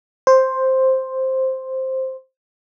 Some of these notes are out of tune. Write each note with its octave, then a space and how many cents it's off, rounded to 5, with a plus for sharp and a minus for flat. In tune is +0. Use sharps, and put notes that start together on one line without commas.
C5 +5